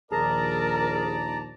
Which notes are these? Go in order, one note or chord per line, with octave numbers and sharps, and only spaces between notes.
A#1 D#2 G#4 A#4 D5 A5 A#5